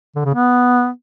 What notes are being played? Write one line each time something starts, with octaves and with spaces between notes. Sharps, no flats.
D3
C#3
B3